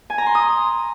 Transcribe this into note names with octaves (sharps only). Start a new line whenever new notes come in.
G#5
A#5
C6
D#6